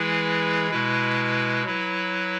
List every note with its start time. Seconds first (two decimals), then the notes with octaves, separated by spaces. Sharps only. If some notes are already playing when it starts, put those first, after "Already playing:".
Already playing: E3 G#3 E4 G#4 B4
0.71 B2 G#3 E4 B4
1.65 F#3 E4 B4